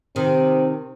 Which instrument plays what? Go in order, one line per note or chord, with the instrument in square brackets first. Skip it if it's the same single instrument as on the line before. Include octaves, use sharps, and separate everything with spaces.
[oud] C3 D#3 [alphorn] C4